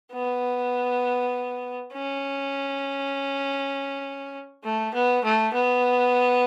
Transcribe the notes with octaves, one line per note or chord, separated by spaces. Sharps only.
B3
C#4
A3
B3
A3
B3